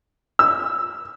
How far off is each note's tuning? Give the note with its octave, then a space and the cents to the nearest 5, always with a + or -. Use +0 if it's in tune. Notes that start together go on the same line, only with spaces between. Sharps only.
E6 -5